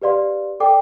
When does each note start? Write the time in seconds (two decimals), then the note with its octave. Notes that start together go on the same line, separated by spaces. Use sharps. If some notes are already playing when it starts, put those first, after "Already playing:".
0.02 G4 B4 D5 F5 C6
0.60 A4 D5 G5 D6